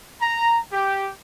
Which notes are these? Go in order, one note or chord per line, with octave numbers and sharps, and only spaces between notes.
A#5
G4